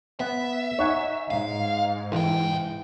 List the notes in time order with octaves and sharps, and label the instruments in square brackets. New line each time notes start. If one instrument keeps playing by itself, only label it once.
[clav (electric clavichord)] B3 [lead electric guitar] E5
[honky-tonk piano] D#4 [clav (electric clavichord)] C#5 F#5 G#5
[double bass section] G#2 [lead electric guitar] F5
[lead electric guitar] C#2 G5 [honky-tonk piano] E3